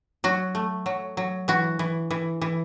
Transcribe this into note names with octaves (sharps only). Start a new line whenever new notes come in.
F#3 F#4
A3
F#3
F#3
E3 F#4
E3
E3
E3